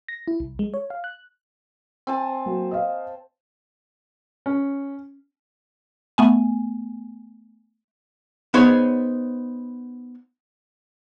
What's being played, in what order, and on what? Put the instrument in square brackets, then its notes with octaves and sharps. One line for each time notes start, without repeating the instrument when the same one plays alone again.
[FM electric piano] A#6
E4
C2
G#3
C#5
F5
F#6
[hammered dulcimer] C4 G#5 A5
[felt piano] F#3 A#3
D#5 F5
[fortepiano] C#4
[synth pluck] A3 B3 G#5
[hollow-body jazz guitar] B3 D#4 G#4 C5 C#5